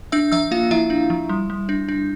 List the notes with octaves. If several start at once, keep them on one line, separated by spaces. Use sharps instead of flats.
D4 E5 E6
F3 E5 E6
A#3 F4 F5
F3 E4 E5
D4
F3
G3
G3
D4
D4